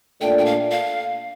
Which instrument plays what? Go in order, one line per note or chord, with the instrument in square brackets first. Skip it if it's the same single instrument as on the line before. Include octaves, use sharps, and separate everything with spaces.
[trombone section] A#2 A3 D4 [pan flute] G5
[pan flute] G5
F5
F5